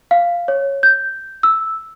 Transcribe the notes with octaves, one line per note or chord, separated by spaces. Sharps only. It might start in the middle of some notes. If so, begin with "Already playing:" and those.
F5
C#5
G6
E6